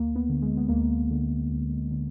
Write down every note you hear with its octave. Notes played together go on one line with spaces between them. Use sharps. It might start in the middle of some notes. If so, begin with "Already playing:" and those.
Already playing: D2 A#3
B3
D3
G#3
B3
D2 A#3
D3
D2
D3